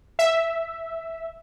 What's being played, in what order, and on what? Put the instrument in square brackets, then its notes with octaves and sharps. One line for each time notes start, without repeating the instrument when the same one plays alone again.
[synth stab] E5